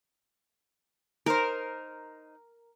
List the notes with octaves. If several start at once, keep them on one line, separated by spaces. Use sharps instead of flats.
D#4 A#4 C5